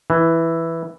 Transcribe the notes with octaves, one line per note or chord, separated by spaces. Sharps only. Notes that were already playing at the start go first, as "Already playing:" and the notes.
E3